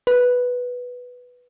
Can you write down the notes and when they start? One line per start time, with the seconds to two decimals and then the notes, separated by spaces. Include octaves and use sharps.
0.07 B4